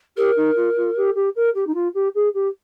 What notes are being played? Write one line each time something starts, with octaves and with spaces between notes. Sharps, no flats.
G4 A#4
D#4
F4
F4
G4
G4
A#4
G4
D#4
F4
G4
G#4
G4